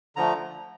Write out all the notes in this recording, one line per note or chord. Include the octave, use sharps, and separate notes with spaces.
D3 F3 A3 A#5